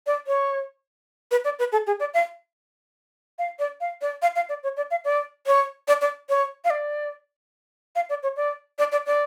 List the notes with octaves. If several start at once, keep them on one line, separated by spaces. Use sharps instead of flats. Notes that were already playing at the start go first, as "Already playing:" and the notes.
D5
C#5
B4
D5
B4
A4
G#4
D5
F5
F5
D5
F5
D5
F5
F5
D5
C#5
D5
F5
D5
C#5
D5
D5
C#5
F5
D5
F5
D5
C#5
D5
D5
D5
D5